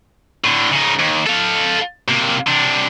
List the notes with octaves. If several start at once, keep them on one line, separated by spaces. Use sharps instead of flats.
A2 D3
C#3 D#4
D#2
A4 F5
C3 A#3
C3 D4